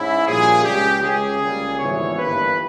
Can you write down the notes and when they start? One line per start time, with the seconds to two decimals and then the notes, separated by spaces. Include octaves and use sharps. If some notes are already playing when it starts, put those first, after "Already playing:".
Already playing: G#2 C#4 E4
0.26 A#1 A#2 G3 G#4
0.64 C#2 C#3 G#3 G4
1.03 C#2 C#3 G#3 C#4 G#4
1.42 C#2 C#3 G3 A#3 C#4
1.79 G#1 G#2 E3 G3 B3 C#5
2.18 G1 G2 E3 A#3 B4